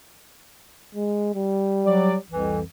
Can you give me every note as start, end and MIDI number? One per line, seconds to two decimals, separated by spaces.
0.95 1.31 56
1.35 2.18 55
1.85 2.16 54
1.85 2.16 74
2.30 2.62 36
2.30 2.62 41
2.30 2.62 52